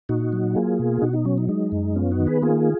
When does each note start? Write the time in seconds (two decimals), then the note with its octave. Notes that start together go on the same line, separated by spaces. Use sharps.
0.09 A#2 D#4 F#4
0.33 F#3
0.55 A#3 F4 G#4
0.79 B2
1.02 B2 D#4 F#4
1.13 D#4
1.25 F#3 C#4
1.38 D#4
1.49 G#3 D#4
1.72 F#2
1.95 B3 C#4 F4
2.12 D#4 F#4
2.19 D#3
2.27 G#4 B4
2.42 A#3 F4 G#4